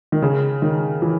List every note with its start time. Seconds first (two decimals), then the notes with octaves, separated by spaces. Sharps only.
0.12 D#3
0.22 C#3
0.62 D#3
1.02 E3